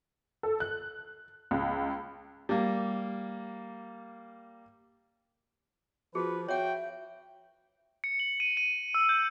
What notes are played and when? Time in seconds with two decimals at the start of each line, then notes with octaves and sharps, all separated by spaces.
0.43 A4
0.60 F#6
1.51 C#2
2.49 G3 A#3
6.15 F3 F4 F#4 G#4 B4
6.48 F#4 C#5 E5 F#5 G5
8.04 C#7
8.20 F#7
8.40 D#7
8.57 D#7
8.94 E6
9.09 G6